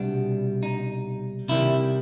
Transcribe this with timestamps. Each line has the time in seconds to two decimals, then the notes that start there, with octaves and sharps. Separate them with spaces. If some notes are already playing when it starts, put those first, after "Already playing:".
Already playing: C2 B2 G3 B3 D4
0.63 D#4
1.48 C3 D#3 G3 E4